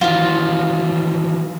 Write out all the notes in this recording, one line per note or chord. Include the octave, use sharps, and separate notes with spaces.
D#3 E3 F#3 F4 F5